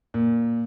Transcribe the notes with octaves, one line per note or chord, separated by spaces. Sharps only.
A#2